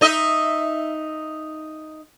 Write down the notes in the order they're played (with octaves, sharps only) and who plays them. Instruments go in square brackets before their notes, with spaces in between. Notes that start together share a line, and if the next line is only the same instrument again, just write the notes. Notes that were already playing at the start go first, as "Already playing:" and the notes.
[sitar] D#4 D#5 E5